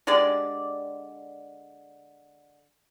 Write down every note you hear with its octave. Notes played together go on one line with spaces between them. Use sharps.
D3 G#3 G4 D5